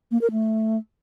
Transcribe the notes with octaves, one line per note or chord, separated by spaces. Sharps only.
A#3
A#4
A3